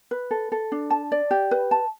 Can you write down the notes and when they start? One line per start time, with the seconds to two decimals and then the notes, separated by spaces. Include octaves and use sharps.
0.11 B4
0.31 A4
0.52 A4
0.72 D4
0.90 A5
1.12 D5
1.31 G4
1.51 B4
1.71 A5